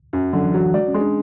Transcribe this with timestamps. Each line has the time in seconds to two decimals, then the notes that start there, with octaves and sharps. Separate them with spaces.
0.13 F#2
0.33 D3 F#3
0.43 E3
0.53 E3 F#3
0.64 E3
0.74 G#3 D5
0.88 C#4
0.94 G#3
1.01 D4